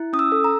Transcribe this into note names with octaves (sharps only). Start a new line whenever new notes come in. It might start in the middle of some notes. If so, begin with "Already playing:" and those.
Already playing: E4
C#4 D#6
E6
A4
A#5